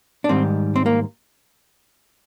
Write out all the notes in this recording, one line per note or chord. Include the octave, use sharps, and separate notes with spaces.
D4
G#2 D#3 G3 C4
C4
A#3